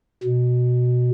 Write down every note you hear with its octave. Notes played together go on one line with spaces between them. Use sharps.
B2